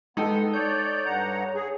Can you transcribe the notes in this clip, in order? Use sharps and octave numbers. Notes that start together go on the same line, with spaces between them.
G#3 B3 D#4 A4 G5
C#5 D5 G6
G2 F#5 A#5
C#5
G#4